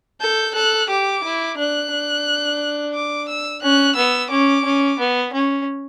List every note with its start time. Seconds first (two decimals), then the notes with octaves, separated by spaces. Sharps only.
0.21 A4 G6
0.55 A4 F#6
0.89 G4 D6
1.24 E4
1.57 D4 F#6
1.92 D4
2.94 D6
3.29 E6
3.62 C#4 F#6
3.96 B3 E6
4.31 C#4 D6
4.65 C#4
4.99 B3
5.33 C#4